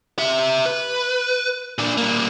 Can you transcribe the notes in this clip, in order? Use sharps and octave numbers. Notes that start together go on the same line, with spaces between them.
G4 E5
B4
A#2 D4
G3 A#3